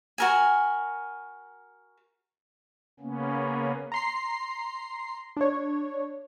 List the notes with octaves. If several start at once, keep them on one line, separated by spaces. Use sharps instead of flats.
F#4 A#4 G#5
C#3 A#3 B3 C#4
A#5 C6 C7
D4 C#5